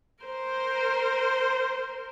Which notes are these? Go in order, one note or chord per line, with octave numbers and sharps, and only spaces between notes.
A#4 C5